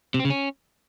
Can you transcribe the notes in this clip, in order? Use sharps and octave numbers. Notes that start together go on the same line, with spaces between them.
C3
C4
C#3
C#4